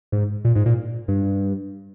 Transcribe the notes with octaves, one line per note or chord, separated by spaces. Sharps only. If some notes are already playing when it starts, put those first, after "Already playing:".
G#2
A#2
G#2
A#2
G2